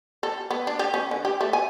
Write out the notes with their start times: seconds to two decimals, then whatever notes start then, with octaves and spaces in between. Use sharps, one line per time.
0.23 A4
0.51 B3
0.67 D4
0.79 G4
0.94 C#4
1.11 D3
1.25 G4
1.41 A3
1.53 G#5